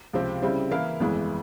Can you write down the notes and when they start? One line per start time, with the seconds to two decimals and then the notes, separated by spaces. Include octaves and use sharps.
0.13 C#2 C3 F3 C4 G4
0.42 C#3 G3 C4 E4
0.71 E3 A#3 E4 A#4 F5
1.00 G1 F2 E3 G#3